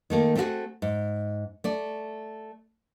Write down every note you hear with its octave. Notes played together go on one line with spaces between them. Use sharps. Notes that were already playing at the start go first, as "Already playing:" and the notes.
D#3 A3 A#3
A3 B3 C4 E4 F#4 G#4
G#2
A3 D5